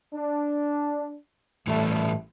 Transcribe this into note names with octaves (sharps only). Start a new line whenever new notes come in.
D4
A1 A2 E3 G3 A3